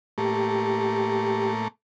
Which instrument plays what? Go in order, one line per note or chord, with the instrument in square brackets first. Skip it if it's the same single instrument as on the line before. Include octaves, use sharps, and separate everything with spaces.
[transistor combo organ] A2 A3 A#3 [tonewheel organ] G4